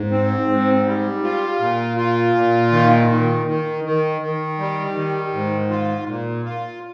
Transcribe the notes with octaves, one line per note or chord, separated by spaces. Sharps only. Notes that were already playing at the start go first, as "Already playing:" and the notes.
Already playing: G#2
C4
G#2
G3
F4
A#2
F4
A#2
D#3
D#3
D#3
D#3
D#3
G3
D#3
G#2
F4
A#2
F4